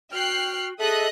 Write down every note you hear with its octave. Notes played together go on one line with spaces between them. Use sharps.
F#4 G5 F6 F#6 C7
G#4 A4 D#5 E5 D#6 F#6